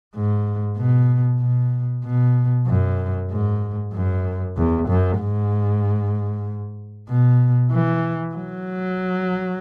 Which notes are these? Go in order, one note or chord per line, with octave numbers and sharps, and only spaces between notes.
G#2
B2
B2
B2
F#2
G#2
F#2
E2
F#2
G#2
B2
E3
F#3